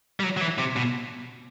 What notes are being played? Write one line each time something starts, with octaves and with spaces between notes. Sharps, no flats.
G3
F#3
F#3
E3
C3
B2